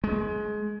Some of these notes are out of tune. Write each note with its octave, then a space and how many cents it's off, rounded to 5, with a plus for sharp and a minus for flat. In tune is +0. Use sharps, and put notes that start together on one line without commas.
G#3 +20